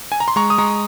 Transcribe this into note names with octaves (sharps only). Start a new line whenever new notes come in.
G#5
A#5
C6
G#3 A#5 C#6
D#6
G#3 A#5 C#6